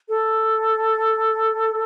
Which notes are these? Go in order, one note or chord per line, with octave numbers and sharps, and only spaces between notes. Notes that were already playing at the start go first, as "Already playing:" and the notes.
A4